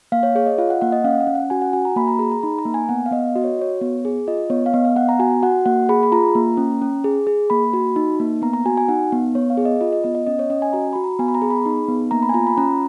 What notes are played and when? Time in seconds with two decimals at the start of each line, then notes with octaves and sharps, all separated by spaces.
0.12 A#3 F5
0.23 C#5
0.35 G#4 C#5
0.47 D#5
0.58 F4 F5
0.70 F#5
0.81 A#3 F#5
0.92 D#5
1.04 C#4 F5
1.20 F#5
1.27 C#4
1.35 F#5
1.50 F#4 G#5
1.62 F#5
1.73 F#4 G#5
1.85 A#5
1.96 A#3 B5
2.08 A#5
2.19 G#4 A#5
2.32 A#5
2.43 D#4 B5
2.58 A#5
2.65 A#3
2.74 G#5
2.89 B3 F#5
3.06 F5
3.11 B3 D#5
3.36 F#4 D#5
3.44 C#5
3.59 F#4 C#5
3.81 B3
4.05 G#4
4.27 F4 D#5
4.50 B3 C#5
4.66 F5
4.73 B3 D#5
4.85 F5
4.96 B3 F#5
5.09 A#5
5.20 F#4 G#5
5.43 F#4 F#5
5.66 A#3 F#5
5.89 G#4 B5
6.03 B5
6.12 F4 A#5
6.35 A#3
6.57 C#4
6.82 C#4
7.04 G#4
7.27 G#4
7.50 A#3 B5
7.73 F#4
7.96 D#4
8.20 A#3
8.42 B3 A#5
8.53 A#5
8.65 F#4 G#5
8.77 G#5
8.88 D#4 F#5
9.12 B3
9.35 B3 C#5
9.50 F5
9.57 G#4
9.65 D#5
9.81 F4 D#5
9.93 D#5
10.04 B3 D#5
10.15 D#5
10.27 C#4 D#5
10.39 C#5
10.50 C#4 D#5
10.62 G#5
10.73 F#4 A#5
10.93 F#4 B5
11.04 A#5
11.19 B3 G#5
11.28 B5
11.35 A#5
11.42 G#4
11.50 B5
11.66 D#4
11.88 B3
12.11 A#3 A#5
12.22 B5
12.29 G#5
12.34 F4 A#5
12.47 B5
12.58 C#4 A#5